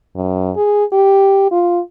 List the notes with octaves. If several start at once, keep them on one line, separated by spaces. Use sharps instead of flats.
F#2
G#4
G4
F4